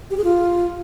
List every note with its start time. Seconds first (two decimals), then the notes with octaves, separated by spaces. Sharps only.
0.11 G4
0.17 G#4
0.24 F4